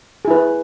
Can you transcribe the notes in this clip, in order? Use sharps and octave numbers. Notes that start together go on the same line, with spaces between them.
E4 G#4 B4